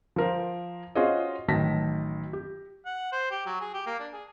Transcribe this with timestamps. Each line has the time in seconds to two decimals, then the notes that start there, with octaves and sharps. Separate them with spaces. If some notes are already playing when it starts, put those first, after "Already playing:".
0.16 F3 A#4 C5
0.95 C#4 F4 F#4 G#4 C5 D#5
1.48 A1 D#3 F#3 A5 A#6 B6
2.33 G4
2.85 F#5
3.12 C5
3.31 G4
3.46 F#3
3.60 G#4
3.74 G4
3.86 A#3
3.99 D4
4.13 G#4